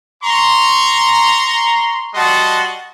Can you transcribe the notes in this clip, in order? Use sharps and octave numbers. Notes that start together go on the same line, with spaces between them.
A#5 C6 C#6
G3 F#4 D#5 F#5 A5 C6